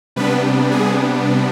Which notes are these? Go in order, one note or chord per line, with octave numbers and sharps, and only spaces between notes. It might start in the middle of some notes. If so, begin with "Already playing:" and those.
C3 G3 B3 D4 B4
G#4